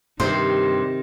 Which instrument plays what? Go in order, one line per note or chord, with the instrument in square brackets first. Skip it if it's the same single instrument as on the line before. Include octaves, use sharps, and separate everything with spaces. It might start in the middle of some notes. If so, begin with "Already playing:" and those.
[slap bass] G2 [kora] C3 C4 [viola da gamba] D#3 [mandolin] C5